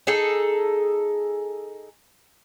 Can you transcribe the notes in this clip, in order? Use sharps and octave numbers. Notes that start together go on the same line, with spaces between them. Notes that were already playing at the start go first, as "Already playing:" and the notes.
D#4 G#4 A4